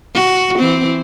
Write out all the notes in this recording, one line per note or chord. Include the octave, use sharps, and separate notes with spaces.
F#4
E3 C4